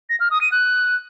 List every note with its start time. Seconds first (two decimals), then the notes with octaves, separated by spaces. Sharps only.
0.10 A#6
0.20 F6
0.31 D#6
0.41 D#7
0.52 F#6